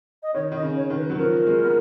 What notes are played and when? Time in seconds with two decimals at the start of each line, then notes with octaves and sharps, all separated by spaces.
0.23 D#5
0.34 D#3 C#5
0.52 D#3 D#5
0.62 C#3
0.76 C#5
0.90 D#3
0.97 B4
1.10 F#3
1.18 F3 A#4
1.47 G#3
1.64 B3